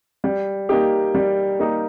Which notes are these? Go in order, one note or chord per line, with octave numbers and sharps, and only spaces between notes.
G3
A#3 D#4 G4
G3
A#3 D#4 G4